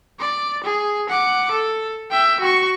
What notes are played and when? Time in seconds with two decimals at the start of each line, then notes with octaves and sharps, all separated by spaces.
0.20 D5
0.64 G#4
1.09 F#5 D6
1.51 A4
2.10 E5 G5
2.40 F#4 C#6